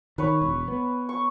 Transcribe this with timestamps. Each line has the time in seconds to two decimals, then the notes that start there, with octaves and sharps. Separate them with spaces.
0.18 D#3 B4 C#5 B5
0.41 E1
0.68 B3
1.09 C#6